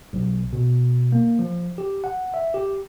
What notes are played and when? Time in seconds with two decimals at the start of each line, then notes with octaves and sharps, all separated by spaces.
0.13 B1
0.53 B2
1.12 A#3
1.39 F3
1.78 G4
2.04 F#5
2.34 E5
2.54 G4